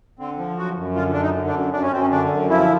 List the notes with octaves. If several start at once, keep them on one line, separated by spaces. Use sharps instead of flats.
D3 C4
F3
F#2 F#4
F#2
D3 F4
F#2 D4
D#4
D3
D4
F#2
F#2 D4
C#4
F#2 C4
C#4
D3 D4
F#2
F3 E4